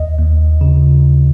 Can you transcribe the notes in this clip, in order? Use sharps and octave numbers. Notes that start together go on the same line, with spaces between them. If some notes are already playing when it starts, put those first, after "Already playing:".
Already playing: D#2 D#5
D#2
C#3